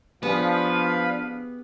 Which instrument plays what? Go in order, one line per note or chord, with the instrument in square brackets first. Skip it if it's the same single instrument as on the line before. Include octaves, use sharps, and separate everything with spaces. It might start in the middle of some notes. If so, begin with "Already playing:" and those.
[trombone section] F3 [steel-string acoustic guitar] B3 G4 G#4 [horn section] D4 F5 [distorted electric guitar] B4